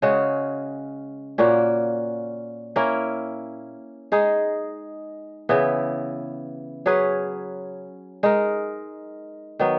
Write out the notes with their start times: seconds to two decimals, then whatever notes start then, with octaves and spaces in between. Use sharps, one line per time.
0.02 C#3 G#3 C#4 F#4
1.38 A#2 A#3 C#4 F#4
2.76 A#3 C#4 E4 A#4
4.12 G#3 D#4 G#4
5.49 C#3 E3 B3 E4
6.86 F#3 C#4 G#4 B4
8.23 G#3 D#4 A#4
9.59 D#3 F#3 B3